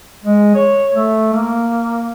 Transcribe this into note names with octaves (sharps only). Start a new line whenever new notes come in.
G#3
C#5
A3
A#3